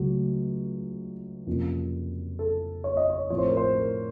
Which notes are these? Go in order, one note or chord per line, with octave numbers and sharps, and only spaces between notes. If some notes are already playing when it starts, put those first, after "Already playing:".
Already playing: C#2 C#3 F#3 A3 F#4
F2 C3 F3 A#3 C#4
A4
C#5
D#5
C#5
A2 F3 C4 C#5
C5
A#4
C5
A#4